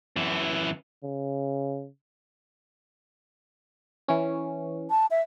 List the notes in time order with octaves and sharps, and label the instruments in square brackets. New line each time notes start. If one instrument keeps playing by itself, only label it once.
[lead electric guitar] F#2 E3
[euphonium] C#3
[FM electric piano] E3 C#4
[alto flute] A5
E5